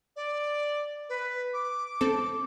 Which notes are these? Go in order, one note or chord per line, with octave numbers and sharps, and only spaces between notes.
D5
B4
D6
C4 A4